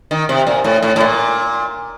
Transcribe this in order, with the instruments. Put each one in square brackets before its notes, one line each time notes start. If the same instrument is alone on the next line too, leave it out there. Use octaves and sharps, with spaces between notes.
[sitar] D#3
C3
A#2
A2
A2
A2
A#2